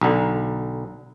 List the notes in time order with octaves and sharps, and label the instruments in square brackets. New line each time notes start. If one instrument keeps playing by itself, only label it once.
[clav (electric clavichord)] B1 D3